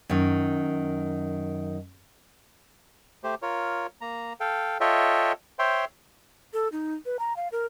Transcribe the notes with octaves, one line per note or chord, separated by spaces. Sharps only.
F#2 D#3
A3 G4 C5
F4 A#4 C#5
A#3 A#5
A4 F5 G5
F4 A4 C#5 D#5 E5 G5
C5 C#5 E5 G5 C6
A4
D#4
B4
A#5
F5
A#4